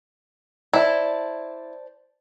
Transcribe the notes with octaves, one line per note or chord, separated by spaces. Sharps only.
E4 C5 D5 A5